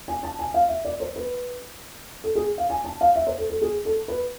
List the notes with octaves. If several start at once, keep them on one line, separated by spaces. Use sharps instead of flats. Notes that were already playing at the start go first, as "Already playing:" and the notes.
G#5
A5
G#5
F5
E5
D5
C5
B4
A4
G#4
F5
G#5
A5
F5
E5
C5
A4
A4
G#4
A4
B4